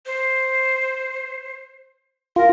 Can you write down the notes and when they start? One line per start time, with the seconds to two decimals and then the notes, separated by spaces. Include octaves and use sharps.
0.06 C5
2.36 F4 A#4